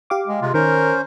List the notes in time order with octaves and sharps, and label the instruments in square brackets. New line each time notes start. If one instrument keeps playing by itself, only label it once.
[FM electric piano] G4 F5 D6
[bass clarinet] G#3
[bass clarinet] C3 [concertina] G#3 F4
[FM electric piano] D#3 [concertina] C#4 C5 [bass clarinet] A#4